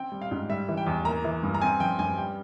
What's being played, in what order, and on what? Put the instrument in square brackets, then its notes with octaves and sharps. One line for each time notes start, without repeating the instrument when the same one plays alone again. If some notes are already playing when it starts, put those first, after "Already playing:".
Already playing: [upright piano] C4 G5
G3
F5
G#2
G3 E5
E3
G5
E2
A#3 A#5
E3
G2
A#5
C4 G#5
F3 G5
G2 G#5
G3 G5